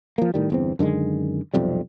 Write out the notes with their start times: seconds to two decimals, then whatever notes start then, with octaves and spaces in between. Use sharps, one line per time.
0.18 F3 A#3
0.34 A2 D#3 G3
0.50 G1 E2 C4
0.79 F#2 D3 D#3 G#3
1.54 B1 F2 C3 G3